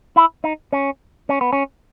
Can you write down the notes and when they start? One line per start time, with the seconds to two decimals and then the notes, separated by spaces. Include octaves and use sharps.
0.16 E4
0.44 D#4
0.73 C#4
1.29 C#4
1.41 B3
1.53 C#4